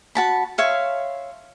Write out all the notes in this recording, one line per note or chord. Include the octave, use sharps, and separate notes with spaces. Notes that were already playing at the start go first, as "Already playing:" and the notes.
F#4 A5 B5
C#5 E5 F5 C6